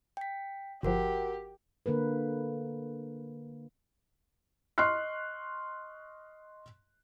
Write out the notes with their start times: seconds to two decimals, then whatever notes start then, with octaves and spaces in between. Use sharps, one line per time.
0.17 G5 B6
0.83 G1 F3 F#4 G4 A#4 F#5
1.86 D3 A#3 A#4 B4
4.78 D#5 C6 C#6 F6 F#6 C7